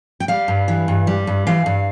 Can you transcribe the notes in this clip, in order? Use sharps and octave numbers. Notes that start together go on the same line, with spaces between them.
G5
G3 F5
G2
E3
G2
G3
G2
E3 F5
G2